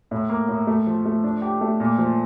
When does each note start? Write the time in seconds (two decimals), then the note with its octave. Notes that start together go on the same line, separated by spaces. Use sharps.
0.11 A2
0.30 A#3
0.49 A2
0.67 A3
0.87 F3
1.06 A3
1.24 D4
1.42 G4
1.61 A3
1.80 A#2
1.98 F3